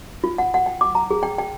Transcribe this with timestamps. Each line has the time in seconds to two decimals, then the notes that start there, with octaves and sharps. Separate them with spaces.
0.24 F4
0.38 F#5
0.54 F#5
0.66 G5
0.81 D6
0.95 A#5
1.11 G#4
1.23 G5
1.38 G5